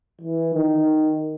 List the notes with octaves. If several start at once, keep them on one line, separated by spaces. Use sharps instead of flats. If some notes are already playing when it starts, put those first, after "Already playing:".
E3
D#3